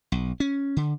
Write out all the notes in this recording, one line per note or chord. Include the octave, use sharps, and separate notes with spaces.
B1
C#4
D3